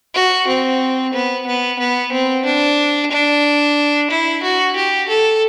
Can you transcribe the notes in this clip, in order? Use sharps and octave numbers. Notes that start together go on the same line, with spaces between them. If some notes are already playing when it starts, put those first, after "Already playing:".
F#4
C4
B3
B3
B3
C4
D4
D4
E4
F#4
G4
A4